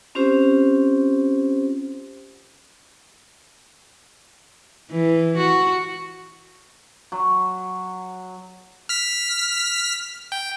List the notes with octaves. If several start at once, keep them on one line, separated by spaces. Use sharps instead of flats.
C4 C#4 F4 G4 C5
E3
F#4
F#3
F6 B6
G5